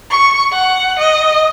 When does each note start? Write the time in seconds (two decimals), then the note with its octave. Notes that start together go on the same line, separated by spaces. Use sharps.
0.10 C#6
0.52 F#5
0.99 D#5